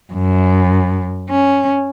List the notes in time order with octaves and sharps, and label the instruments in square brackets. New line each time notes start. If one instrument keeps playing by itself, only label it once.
[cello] F#2
C#4